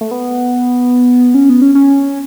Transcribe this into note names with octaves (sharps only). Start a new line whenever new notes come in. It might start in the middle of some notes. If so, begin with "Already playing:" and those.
A3
B3
C#4
B3
C#4
C#4